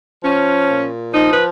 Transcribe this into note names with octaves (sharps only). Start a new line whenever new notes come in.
F3 C#4
A#2
F3 D#4
B4